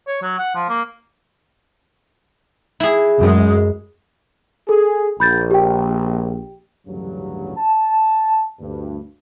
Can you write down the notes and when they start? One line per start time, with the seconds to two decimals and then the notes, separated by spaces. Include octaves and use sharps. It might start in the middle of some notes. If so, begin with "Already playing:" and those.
0.07 C#5
0.22 F#3
0.38 F#5
0.55 F3
0.69 A#3
2.80 E4 G#4
3.18 F#2 G#3
4.69 G#4 A4
5.20 A#1 B5 G6 A6
5.51 G4 G5
6.87 A1 D2 G2 C#3 F#3
7.57 A5
8.60 D2 G2